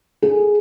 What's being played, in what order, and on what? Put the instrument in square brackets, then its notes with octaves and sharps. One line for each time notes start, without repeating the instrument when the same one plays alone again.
[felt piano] G#4